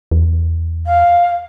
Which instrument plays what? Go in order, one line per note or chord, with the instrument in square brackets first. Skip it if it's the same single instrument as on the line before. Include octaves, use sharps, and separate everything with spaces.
[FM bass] E2
[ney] F5